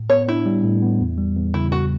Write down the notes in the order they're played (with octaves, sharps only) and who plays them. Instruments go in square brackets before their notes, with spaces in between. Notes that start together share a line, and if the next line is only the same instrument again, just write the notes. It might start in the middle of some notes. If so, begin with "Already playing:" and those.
Already playing: [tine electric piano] A2
[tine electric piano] B3 [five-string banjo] C#5
[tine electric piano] D4 [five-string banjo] E4
[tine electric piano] G3
A2
B3
E2
G3
E2
[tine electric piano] C#3 [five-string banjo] E4
[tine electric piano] E2 [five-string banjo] F#4